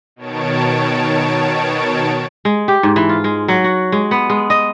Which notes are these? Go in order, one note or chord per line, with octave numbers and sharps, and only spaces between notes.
B2 D#3 C#5 A5 D7
G#3
G4
G#2
E3
F4
G#3
F#3
F#4
G#3
B3
G#3
D#5